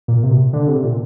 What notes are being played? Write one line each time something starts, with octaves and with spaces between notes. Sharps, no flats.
A#2
C3
D3
C3
A#2